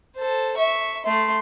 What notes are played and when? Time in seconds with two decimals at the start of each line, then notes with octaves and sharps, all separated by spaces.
0.16 A4 C5
0.57 E5 C#6
1.04 A3 C6